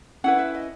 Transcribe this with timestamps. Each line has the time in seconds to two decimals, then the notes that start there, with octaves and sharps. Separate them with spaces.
0.24 C#4 E4 B4 F#5
0.39 E5
0.54 D#5